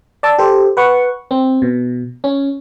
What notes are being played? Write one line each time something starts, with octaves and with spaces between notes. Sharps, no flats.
D5 A5 D6 E6
G4 A4 C5
B4 F#5 C#6
C4
B2
C#4